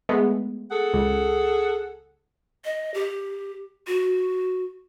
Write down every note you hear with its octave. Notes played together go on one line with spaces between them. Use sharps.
G#3 A3 B3
G#4 A4 F#5
C#2
D#5
G4
F#4